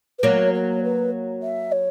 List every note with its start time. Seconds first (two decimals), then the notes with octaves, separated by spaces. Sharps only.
0.19 B4
0.23 F#3 A#3 C#5
0.54 C#5
0.84 B4
1.43 E5
1.72 C#5